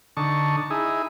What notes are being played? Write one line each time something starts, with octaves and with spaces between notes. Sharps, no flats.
D3 D#4 A5 C#6
D#4 E4 G#4